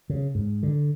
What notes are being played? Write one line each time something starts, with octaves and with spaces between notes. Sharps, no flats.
C#3
G#2
D3